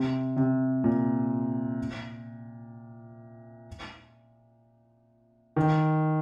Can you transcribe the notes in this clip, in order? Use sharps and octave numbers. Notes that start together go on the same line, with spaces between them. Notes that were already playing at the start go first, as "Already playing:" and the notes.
Already playing: C3
C3
A#2
D#3